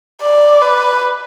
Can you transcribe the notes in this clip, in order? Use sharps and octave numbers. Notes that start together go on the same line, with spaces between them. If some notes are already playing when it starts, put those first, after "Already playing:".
D5
B4